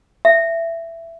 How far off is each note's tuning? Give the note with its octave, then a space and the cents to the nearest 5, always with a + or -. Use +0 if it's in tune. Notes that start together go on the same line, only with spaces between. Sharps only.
E5 +15